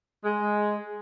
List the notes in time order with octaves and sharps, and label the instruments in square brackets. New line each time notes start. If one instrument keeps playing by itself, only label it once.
[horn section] G#3